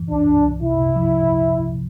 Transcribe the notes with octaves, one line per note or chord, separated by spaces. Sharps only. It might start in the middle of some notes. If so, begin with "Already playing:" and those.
Already playing: E3
C2 D4
C2
C2
C3 E4
C3
F3